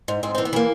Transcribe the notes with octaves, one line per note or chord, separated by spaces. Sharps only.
G#2
G#2 C4
E3 C4
B3
E3 A#3